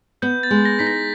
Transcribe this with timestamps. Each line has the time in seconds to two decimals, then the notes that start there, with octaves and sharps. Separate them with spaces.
0.22 B3 G6
0.43 A6
0.50 G#3
0.65 A#6
0.79 D#4 B6
0.87 A#6